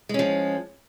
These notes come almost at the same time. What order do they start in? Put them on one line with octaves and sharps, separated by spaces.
G#3 C#4 F3